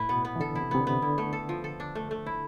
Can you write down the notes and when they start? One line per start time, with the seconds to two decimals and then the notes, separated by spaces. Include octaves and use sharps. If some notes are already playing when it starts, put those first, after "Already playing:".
Already playing: A2 E4 B4
0.09 B2 B3
0.25 B3
0.36 E3
0.40 D3 A4
0.55 E4
0.61 C3
0.71 C3 B3
0.81 D3
0.87 B3
1.02 D3 E4
1.18 A3
1.33 A4
1.49 F3
1.64 A4
1.80 D4
1.95 A3
2.11 A3
2.26 E4